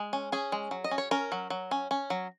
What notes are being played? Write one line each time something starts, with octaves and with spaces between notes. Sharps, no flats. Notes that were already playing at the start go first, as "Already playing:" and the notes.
Already playing: G#3
C#4
C#4 G#4
G#3
F#3
D#5
C#4
C#5
C#4 A#4
F#3
F#3
C#4
C#4
F#3